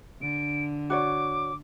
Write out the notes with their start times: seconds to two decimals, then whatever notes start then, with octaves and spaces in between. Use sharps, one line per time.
0.22 D3 D7
0.90 F#4 C#5 D5 D6